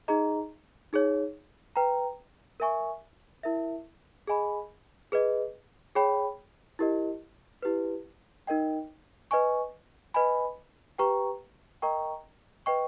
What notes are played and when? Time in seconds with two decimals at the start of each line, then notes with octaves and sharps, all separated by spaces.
0.08 D#4 G#4 D#5 A#5
0.93 D#4 G#4 C#5
1.76 B4 G5 A#5
2.60 A#4 E5 G#5 C#6
3.43 E4 A#4 E5
4.27 G#4 D#5 G#5 B5
5.12 G#4 B4 D#5
5.95 G#4 C#5 G5 B5
6.79 E4 G4 A#4 D#5
7.62 E4 G4 B4
8.47 D#4 A#4 D#5 G5
9.31 B4 D#5 G#5 C#6
10.14 B4 D#5 G#5 B5
10.98 G4 B4 G5 A#5 C#6
11.82 A#4 D#5 G5 A#5 C#6
12.66 B4 D#5 G5 C#6